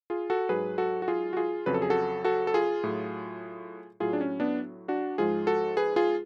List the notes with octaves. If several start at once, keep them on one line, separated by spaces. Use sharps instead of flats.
F4 G#4
F#4 A4
G#2 F#3 G#4 B4
F#4 A4
F#4
F4 G#4
F#4
F4 G#4
F2 C#3 F#3 B4
A4
G#4
F#4 A4
F#4 A4
A4
F4 G#4
A2 F#3
A2 F#3 F4 G#4
D4
C#4
B3 D4
D4 F#4
G#2 F3 G#3 F4 G#4
F#4 A4
G#4 B4
F4 G#4